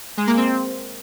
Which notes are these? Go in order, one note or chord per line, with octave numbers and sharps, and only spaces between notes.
G#3
A#3
C4